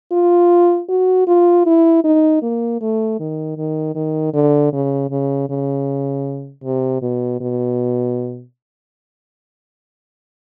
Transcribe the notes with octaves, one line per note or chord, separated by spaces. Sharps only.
F4
F#4
F4
E4
D#4
A#3
A3
D#3
D#3
D#3
D3
C#3
C#3
C#3
C3
B2
B2